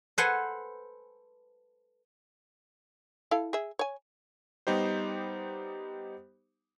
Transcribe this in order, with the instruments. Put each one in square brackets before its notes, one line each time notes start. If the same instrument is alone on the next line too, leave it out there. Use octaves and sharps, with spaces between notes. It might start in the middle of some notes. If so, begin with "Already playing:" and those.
[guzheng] A4 B4 C5 F#5 G#5
[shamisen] E4 A4 F5
G#4 E5
C#5 G#5
[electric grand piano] G3 B3 D#4 G4 C5